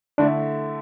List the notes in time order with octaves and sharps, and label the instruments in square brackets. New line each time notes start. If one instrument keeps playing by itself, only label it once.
[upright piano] D3 A3 E4 [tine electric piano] D4